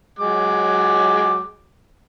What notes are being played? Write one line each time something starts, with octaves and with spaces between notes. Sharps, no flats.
F#3 G#3 D6